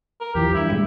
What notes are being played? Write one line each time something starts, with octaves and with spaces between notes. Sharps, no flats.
A#4
E2 E3 F3 G4
G2 E4
A#2 G3 G#3